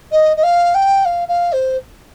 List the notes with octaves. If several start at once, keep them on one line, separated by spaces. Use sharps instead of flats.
D#5
D#5
F5
G5
F5
F5
C5